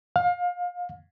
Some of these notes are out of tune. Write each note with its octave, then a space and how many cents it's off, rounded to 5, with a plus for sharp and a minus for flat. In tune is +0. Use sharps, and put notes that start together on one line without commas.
F5 +30